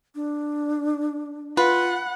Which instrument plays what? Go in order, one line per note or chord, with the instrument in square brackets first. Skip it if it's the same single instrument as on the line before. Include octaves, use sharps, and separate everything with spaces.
[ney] D4
[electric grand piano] F4 [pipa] B4 [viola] F#5